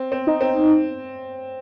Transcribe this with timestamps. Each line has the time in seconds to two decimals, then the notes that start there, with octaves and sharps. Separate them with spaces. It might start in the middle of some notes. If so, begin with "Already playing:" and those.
Already playing: C4
0.12 C4
0.27 D#4
0.41 C4